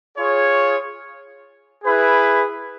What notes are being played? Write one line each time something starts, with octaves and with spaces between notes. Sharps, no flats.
F4 G#4 C#5
E4 G#4 B4